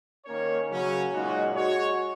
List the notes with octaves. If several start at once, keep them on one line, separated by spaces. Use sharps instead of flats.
D#3 A#3 C#4 A#4 C#5
C#3 F#3 C#4
A#2 G#3 D#4 F#4
G#3 F#4 C#5